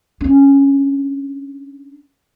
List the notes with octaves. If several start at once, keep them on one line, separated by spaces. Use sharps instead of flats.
C#4 D4